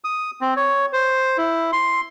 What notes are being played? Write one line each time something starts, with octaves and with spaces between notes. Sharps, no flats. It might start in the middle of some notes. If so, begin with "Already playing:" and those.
D#6
C4
C#5
C5
E4
C6